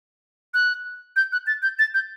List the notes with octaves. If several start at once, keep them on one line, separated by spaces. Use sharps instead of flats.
F#6
G6
F#6
A6
G6
A6
G6